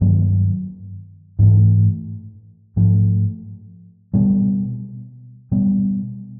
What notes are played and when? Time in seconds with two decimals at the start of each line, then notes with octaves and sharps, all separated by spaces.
0.01 G2 D#3 F#3 A#3
1.39 G#2 E3 A3
2.76 G#2 F3 A3
4.14 B2 G3 B3
5.52 B2 G3 B3